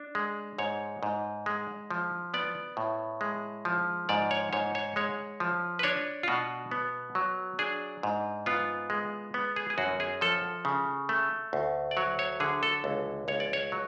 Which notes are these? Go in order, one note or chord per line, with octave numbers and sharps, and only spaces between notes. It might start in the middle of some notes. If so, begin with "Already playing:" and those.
Already playing: D4
G#3
G#2 C#5
G#2
G#3
F3
B3 D5
A2
G#3
F3
G#2 D5
C#5
G#2 C#5
C#5
G#3 C#5
F3
B4
D4 C#5
F4
B2 F#4
B3
F#3
D4 G#4
G#2
B3 F4
G#3
B3
G#4
G#4
F#2 F#4
G#4
F3 A4
C#3
A3
D2
D5
F#3 C#5
C#5
D3 G#4
A4
C#2
C#2 C#5
D5
C#5
F#3